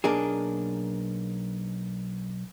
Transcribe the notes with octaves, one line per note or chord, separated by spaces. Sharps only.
B1 A#3 D4 G#4